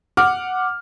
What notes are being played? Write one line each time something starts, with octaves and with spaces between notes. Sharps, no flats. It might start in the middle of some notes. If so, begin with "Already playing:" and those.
F#5 D6 F6